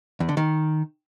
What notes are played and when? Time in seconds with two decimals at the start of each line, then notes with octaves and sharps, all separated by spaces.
0.20 E2
0.29 D3
0.37 D#3